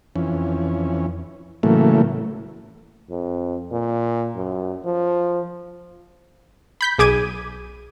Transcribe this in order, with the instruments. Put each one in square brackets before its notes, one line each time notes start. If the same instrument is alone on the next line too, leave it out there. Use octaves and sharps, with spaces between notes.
[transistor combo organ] F2 E3 C#4
A2 C#3 E3 F#3 A3 A#3
[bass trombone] F2
A#2
F#2
F3
[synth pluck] B5 G6 B6
B1 G#4 D6 G#6 D#7